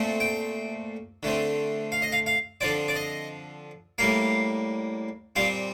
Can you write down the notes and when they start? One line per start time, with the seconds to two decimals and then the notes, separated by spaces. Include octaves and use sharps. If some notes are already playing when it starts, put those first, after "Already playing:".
Already playing: A#2 A3 C4
0.20 G5
1.23 D3 A3 C4
1.92 F5
2.02 D#5
2.12 F5
2.26 F5
2.61 D3 F3 C4 D5
2.88 D5
2.96 D#5
3.98 A2 G3 A#3 F5
5.36 A#2 G3 C4 F5